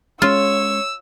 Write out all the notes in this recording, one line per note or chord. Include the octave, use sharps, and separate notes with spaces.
G#3 C#4 F4 C#5 E6